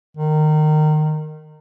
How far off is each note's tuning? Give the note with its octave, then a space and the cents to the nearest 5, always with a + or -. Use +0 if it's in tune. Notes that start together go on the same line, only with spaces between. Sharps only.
D#3 -20